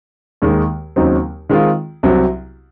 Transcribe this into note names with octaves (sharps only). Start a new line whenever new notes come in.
D#2 D#3 G#3
D#2 C#3 F#3 C4 D#4
D#3 G#3 C4 F4
C2 C3 F#3 C4 F#4